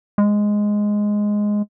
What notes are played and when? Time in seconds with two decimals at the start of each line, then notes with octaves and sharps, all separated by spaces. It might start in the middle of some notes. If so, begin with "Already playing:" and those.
0.18 G#3